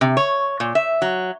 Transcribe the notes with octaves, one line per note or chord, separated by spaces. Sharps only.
C3
C#5
A#2
E5
F#3